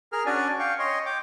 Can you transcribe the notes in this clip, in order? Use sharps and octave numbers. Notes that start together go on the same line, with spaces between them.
G#4 A#4 F6
C#4 D4 F#4 D5 G#5
F5 G5 C#6
C#5 D#5 C6
G5 D6